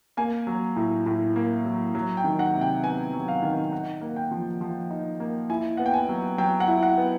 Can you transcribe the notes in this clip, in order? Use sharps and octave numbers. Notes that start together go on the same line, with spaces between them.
A#3 G#5
F#3
A2
A2
A#3
F#3
F#3
G5
D#3
F#5
C3
G5
B3 G#5
F#3
F5
D#3
D#4 F#5
A#3
G5
F3
F3
D#4
A#3
E4 G#5
B3 F#5
G5
G#5
F#3
F#3 G5
F#5
E4
F#5
B3